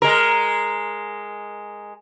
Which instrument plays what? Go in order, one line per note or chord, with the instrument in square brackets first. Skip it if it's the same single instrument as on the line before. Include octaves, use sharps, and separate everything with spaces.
[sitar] G#3 A#4